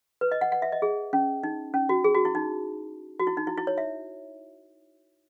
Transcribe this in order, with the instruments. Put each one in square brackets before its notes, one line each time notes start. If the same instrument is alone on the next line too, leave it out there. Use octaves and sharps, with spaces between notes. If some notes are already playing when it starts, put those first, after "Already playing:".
[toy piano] B4
D#5
F#5
F#5
E5
D#5
G#4
C#4
D#4
C#4
F#4
G#4
F#4
E4
D#4
F#4
E4
D#4
E4
E4
C#5
E5